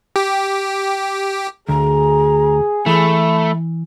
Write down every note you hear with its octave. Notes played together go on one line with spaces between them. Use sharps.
G4
D2 G#4 A#5
E3 A3 B5